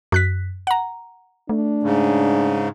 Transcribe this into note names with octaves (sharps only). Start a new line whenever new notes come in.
F#2 F#6 B6
F#5 A#5
A3 D4
G#2 C#3